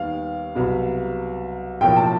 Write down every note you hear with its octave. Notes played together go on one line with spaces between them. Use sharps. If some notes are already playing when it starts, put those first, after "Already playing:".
Already playing: D#2 D#3 G3 B3 F5
C2 B2 F#3 B3
B1 A2 F3 A#3 G5
A5